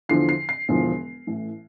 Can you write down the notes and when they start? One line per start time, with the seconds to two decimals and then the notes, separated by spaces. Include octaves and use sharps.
0.09 E2 D3 F3 C7
0.29 C7
0.49 C7
0.69 E1 E2 D3 F3
1.27 A1 A2 E3